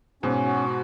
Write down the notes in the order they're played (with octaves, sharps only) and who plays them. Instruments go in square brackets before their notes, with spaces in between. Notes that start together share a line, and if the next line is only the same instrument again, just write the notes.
[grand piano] G#2 B2 [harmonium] C#4
[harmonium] F#4